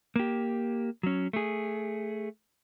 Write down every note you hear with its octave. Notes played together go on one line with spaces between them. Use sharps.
A#3 G4
F#3 C#4
A3 G#4